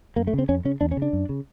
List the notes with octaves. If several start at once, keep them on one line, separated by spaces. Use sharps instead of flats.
F#2 A#3
A3
C#3
C4
F2 C#4
C#3 C#4
E2 D4
C#4
C#3
D4
F#2
C#3